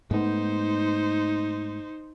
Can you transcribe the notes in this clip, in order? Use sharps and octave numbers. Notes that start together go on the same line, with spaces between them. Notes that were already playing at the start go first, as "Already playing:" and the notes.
G#2 A3 B3 D#4 C5